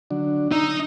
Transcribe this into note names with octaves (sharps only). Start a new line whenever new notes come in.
D3 F#3 D4
D#4 E6